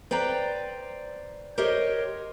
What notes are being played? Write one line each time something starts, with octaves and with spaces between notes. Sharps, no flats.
B4 C5 D5 G5 A#5
G4 A#4 C5 C#5 D#5